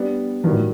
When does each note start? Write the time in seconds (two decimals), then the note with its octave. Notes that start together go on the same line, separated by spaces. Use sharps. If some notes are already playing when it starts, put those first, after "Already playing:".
Already playing: G3 B3 D4
0.44 G2 D#3 E3 F#3
0.52 A2